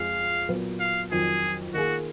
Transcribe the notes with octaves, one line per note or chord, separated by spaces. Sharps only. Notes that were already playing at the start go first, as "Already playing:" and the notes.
Already playing: F2 F3 G#3 F5
A#2 F#3 B3
F5
F2 D#3 F#3 G#4
D#3 A#3 F4 F#4 G#4